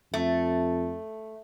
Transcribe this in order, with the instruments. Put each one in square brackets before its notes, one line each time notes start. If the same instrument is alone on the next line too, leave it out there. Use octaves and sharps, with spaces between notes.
[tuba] F2 [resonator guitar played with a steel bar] A3